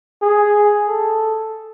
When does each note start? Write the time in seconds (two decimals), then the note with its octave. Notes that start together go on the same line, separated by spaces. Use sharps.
0.22 G#4
0.88 A4